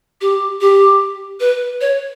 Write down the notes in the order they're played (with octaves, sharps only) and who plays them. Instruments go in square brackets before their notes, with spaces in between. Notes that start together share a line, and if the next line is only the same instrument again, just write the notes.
[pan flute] G4
G4
B4
C#5